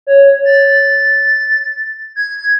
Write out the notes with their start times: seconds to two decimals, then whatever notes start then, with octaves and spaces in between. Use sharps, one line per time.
0.07 C#5
0.45 A6
2.16 G#6